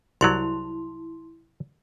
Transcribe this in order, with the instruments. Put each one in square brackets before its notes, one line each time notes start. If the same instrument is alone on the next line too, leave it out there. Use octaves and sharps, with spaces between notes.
[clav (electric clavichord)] C2 F#3 [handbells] E4 C6